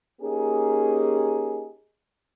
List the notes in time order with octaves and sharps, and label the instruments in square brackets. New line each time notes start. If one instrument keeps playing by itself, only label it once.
[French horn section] A#3 C#4 D#4 G4 G#4